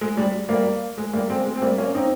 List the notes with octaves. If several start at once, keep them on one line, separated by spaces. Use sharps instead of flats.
G#3
G3
G3 A#3
G#3
G3 A#3
G#3 C4
G#3
C4
G3 A#3
A#3 C#4
C4 D#4